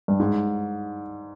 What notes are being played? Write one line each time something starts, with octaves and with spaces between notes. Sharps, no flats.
G2
G#2